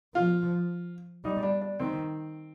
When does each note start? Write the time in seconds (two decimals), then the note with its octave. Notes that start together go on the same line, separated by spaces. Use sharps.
0.15 F3 F4
1.24 G3 D#4
1.43 D4
1.61 D4
1.80 D#3 C4